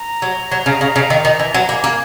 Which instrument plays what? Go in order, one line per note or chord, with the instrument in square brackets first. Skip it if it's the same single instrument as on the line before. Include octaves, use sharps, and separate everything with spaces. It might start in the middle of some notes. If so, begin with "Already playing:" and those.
Already playing: [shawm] A#5
[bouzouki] F#3
F#3
C#3
C#3
C#3
[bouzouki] D#3 [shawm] A#5
[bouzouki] D#3
E3
F#3
[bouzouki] A#3 [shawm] G#5
[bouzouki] A#3